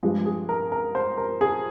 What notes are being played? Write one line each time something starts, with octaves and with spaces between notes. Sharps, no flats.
G2 F3 G#3 G4
G#4
A#4
A#4
C5
A#4
G#4